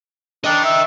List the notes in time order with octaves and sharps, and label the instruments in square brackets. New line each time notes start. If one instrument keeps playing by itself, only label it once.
[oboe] D4 [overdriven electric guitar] D#5 G5
[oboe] E5